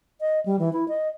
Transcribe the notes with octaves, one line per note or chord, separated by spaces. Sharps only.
D#5
G3
E3
E4
D#5